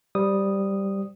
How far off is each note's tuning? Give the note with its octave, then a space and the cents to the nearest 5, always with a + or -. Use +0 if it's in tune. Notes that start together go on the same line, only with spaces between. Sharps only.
G3 +0 C5 -5 D#6 -5